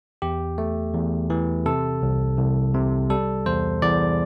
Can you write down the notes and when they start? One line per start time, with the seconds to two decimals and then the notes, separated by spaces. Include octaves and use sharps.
0.22 E2 G4
0.58 A3
0.94 E2
1.30 E3
1.66 C3 A4
2.02 C2
2.38 C2
2.74 C3
3.10 G3 A4
3.46 E2 C5
3.82 E2 D5